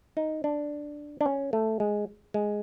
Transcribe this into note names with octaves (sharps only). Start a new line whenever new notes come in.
D#4
D4
D4
C#4
A3
G#3
G#3